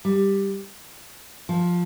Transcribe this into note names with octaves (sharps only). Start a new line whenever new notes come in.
G3
F3